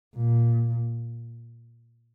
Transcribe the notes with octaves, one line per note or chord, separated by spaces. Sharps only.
A#2